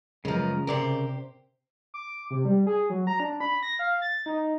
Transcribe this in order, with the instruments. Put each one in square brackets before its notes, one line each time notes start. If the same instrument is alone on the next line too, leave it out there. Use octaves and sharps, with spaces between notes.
[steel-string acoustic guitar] F#2 B3 [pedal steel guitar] C#3 A#5 [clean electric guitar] F3 G#3
[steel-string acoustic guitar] C3 G4 C5 [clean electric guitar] A#4 D5
[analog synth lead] D6
C3
G3
G#4
F#3
A#5
D4
B5
A#6
F5
A6
D#4